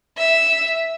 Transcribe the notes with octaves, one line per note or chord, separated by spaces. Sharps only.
E5